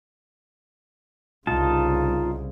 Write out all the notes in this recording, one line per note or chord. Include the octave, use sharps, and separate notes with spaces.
C2 C#3 D#4 F4 A5